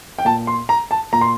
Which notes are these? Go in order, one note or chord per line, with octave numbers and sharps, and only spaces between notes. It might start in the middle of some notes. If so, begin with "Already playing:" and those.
G5
A#2 A5
C6
A#5
A5
A#2 A#5
C6